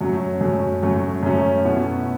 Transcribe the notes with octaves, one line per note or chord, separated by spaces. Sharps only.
F#2 F#3 A3 C#4
F#2 F#3 A3 C#4
F#2 F#3 A3 C#4
F#2 F#3 A3 C#4
B2 B3 E4